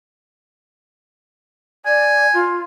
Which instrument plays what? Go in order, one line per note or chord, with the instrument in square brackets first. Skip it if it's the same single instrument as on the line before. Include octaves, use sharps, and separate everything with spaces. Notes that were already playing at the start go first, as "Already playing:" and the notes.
[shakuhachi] D5 [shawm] G#5
[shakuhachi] F4